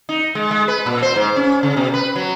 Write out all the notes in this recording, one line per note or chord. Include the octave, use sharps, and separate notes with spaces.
D#4
G#3
G#3
B4
A#2
C5
G#2
C#4
C#3
B2
B4
F#3